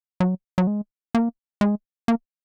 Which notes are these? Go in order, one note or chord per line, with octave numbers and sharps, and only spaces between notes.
F#3
F#3
G#3
A#3
G#3
A#3